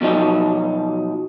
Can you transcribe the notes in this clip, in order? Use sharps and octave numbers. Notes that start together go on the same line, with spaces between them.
B2 F3 F#3 D#4